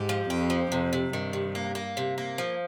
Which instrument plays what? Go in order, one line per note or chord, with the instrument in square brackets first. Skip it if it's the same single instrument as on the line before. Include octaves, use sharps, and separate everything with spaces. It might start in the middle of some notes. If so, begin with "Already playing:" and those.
Already playing: [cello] G#2 [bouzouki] G4
[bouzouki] F3
[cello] F2 [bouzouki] G4
[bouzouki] F3
[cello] F2 [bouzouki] C3
[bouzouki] C3
[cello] G2 [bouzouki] D#3
[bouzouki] C3
A#3
A#3
C3
A#3
F3